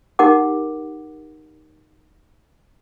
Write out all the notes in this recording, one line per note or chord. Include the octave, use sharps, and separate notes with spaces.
D#4 G4 A#4 F#5 D6